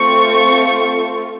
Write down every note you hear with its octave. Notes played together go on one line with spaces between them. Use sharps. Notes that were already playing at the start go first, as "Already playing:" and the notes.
Already playing: A3 C4 F4 C#6